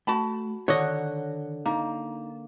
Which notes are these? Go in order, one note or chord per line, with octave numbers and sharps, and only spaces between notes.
A3 F#4 A5 B5
D3 D#3 C#5 D#5 F#5
A#3 D#4 A5